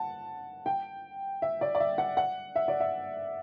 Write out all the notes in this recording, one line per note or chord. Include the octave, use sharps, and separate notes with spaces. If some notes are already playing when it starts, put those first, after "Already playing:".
Already playing: F#5 A5
G5
E5
D5
D5
E5
F#5
F#5
E5
D5
E5